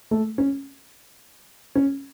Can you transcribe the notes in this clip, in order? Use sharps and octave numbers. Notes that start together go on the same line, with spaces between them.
A3
C#4
C#4